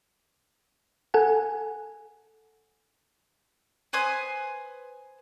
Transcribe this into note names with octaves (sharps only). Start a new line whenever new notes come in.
A4 F#5 G#5
B4 C5 G#5 D#6